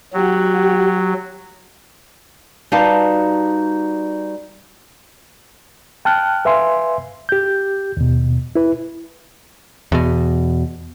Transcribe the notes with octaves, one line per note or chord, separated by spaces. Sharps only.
F#3 F#4 G4
G3 D#4 F#4 B4 F5 A5
G5 A5 F6 F#6
B4 E5 F5 G#5 C6
G4 G6
D#2 B2
E4 B4
E2 B2